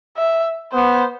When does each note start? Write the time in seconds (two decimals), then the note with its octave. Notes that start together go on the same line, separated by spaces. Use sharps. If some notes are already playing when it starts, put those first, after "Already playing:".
0.17 E5
0.73 B3 C5